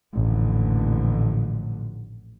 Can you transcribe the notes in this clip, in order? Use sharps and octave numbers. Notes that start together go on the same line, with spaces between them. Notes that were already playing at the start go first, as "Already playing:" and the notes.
A1 F2 A#2 D3